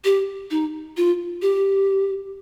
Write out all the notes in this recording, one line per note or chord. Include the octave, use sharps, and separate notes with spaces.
G4
D#4
F4
G4